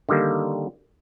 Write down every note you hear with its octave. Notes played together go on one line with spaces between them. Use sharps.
D3 D#3 G3 A#3